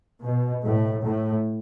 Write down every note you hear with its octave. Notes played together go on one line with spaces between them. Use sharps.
B2
A2
A2